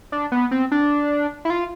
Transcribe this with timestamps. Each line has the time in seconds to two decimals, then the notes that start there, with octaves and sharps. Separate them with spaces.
0.12 D4
0.32 B3
0.51 C4
0.71 D4
1.45 E4
1.50 F4